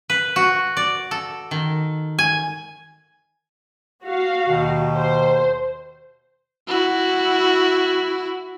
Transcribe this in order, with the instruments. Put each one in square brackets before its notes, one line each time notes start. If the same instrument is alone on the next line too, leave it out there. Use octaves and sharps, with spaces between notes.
[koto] B4
F#4
D5
A4
D#3
G#5
[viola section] F#4 F5
[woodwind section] D#2 B2 D#3
[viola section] C5
[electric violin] E4 F#4